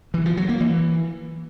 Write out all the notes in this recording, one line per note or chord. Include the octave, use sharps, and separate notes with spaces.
E3
F3
F#3
A#3
E3